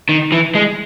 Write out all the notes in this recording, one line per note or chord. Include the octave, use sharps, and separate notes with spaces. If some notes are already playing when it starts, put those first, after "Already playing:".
D#3
E3
G#3